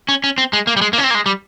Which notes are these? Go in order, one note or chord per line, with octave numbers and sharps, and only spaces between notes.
C#4
C#4
C4
G#3
A#3
G3
G#3
A#3
C#4
C4
A#3
G#3
G3